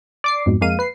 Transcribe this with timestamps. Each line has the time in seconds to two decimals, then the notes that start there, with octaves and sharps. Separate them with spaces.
0.24 D5 D6 C7
0.46 F2 G#2 B2
0.61 F2 G#3 A#3 F5 D#7
0.79 B4 C7